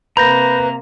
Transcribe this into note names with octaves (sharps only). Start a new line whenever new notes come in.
C3 A#3 B4 A#5 B5 G6 A#6